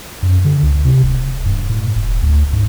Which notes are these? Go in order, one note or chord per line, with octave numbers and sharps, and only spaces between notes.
F#2
D3
C#2
C3
D1
G2
A2
E1
D2
G#2